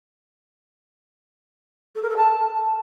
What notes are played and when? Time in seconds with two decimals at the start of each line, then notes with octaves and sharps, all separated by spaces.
1.95 A4
2.02 A#4
2.10 A4
2.17 A5